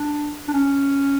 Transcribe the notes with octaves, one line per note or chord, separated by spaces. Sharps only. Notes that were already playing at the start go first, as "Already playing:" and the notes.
Already playing: D4
D4
C#4